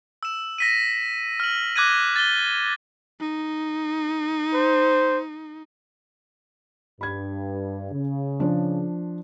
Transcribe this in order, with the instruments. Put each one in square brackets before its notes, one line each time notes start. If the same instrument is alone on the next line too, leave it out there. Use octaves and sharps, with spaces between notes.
[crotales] E6 E7
A#6 B6 D#7
F6 F#7
D6 F#6 G#6 A#6 D#7
A6 G7
[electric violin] D#4
[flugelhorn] C5
[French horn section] G2 [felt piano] B5 G#6
[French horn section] C#3
[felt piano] F3 D4